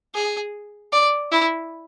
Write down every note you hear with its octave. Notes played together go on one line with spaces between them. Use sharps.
G#4
D5
E4